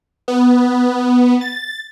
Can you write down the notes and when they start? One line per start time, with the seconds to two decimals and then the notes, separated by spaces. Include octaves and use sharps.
0.28 B3
1.41 A6